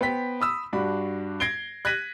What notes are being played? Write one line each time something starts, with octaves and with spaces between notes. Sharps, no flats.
B3 C5 G5 B6
B5 D#6 E6
G2 D4 F#4 B5
G#6 A#6 C7 D7 G7
F#6 G#6 A#6 B6 D#7 F#7